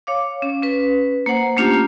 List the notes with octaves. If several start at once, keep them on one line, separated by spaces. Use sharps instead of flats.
C#5 F5 D6
C#4
C#4 B4
A#3 C5 F#5
A3 A#3 C#4 D4 F4 G4